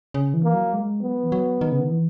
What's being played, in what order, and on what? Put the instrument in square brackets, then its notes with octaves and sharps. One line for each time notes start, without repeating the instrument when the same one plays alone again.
[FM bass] C#3
E3
[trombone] A#3
[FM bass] F#3
G#3
[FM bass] F#3 [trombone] B3
[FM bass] E3
F#3
D#3
C#3
D#3
E3